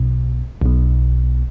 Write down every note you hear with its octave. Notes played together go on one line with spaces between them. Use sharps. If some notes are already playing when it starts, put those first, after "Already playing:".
Already playing: B1 B2
B1 B2